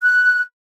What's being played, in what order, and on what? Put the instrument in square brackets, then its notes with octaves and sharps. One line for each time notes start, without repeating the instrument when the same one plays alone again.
[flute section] F#6